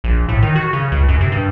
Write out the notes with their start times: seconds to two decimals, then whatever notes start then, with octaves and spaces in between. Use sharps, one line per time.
0.04 A#1
0.29 A2
0.42 D#3
0.56 F#4
0.73 C#3
0.92 C#2
1.08 F#2
1.21 C3
1.32 G2